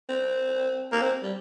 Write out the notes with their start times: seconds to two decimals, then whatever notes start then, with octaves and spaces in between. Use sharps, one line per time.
0.09 C4
0.92 A#3
1.02 C4
1.23 G3